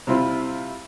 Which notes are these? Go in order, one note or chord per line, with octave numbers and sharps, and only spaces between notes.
C3 G3 C4 E4 F4